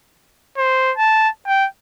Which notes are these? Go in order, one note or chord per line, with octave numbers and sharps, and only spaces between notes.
C5
A5
G5